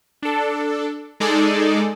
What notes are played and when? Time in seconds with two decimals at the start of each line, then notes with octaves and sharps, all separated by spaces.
0.23 D4 A4
1.20 G#3 D#4 G#4 A4 D5